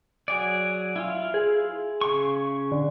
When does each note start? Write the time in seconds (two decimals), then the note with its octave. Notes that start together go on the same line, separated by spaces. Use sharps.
0.28 F#3 G#4 D5
0.96 E4 F4 F5
1.34 G#4
2.01 C#3 C#6
2.72 D3